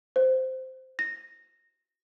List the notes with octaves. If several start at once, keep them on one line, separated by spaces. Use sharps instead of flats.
C5
A#6